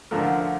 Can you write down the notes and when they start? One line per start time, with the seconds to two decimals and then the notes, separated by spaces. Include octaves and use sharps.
0.11 D2 D3 F3 A3 A#4